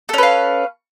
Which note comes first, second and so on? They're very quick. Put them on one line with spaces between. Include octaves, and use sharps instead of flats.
A4 C#4 B4 F5